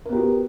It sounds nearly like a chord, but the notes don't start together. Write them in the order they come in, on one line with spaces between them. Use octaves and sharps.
A#4 B3 G4 F#4